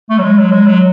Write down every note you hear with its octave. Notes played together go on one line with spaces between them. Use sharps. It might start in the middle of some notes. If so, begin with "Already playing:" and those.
A3
F#3
G#3
F#3
G#3
F#3